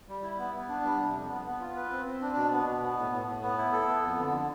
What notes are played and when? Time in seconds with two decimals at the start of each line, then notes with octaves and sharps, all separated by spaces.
0.08 G3
0.23 E4
0.38 B3
0.54 B3
0.69 D4
0.85 G3
1.00 C3
1.14 F2
1.30 B3
1.45 B3
1.60 F4
1.76 B4
1.91 C4
2.06 C4
2.21 D4
2.36 B2
2.52 B3
2.67 B2
2.82 B3
2.97 A2
3.12 A2
3.28 A2
3.42 B3
3.58 E4
3.72 A4
3.88 B3
4.03 F2
4.19 D3